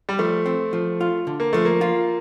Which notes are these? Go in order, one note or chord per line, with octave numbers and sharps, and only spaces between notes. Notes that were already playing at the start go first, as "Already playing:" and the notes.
G3
F3 A3
C4
F3
F4
D3
A#3
F3 A3
A#3
F4